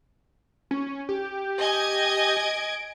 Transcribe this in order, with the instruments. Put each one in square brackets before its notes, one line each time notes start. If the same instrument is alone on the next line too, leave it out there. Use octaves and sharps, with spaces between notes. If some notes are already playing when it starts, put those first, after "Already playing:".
[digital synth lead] C#4
G4
[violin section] D#5 G#5 G#6
[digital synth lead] D7